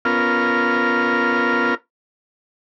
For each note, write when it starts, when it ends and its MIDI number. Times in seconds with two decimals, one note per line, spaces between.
0.05 1.75 59
0.05 1.75 61
0.05 1.75 65
0.05 1.75 70
0.05 1.75 89